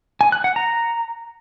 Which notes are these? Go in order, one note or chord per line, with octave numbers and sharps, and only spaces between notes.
G#5
F#6
F#5
A#5